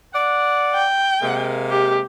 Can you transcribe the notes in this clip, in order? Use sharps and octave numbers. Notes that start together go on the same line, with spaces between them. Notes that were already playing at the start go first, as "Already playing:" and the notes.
D5 F#5
G5
C3 G#3 A#3
G4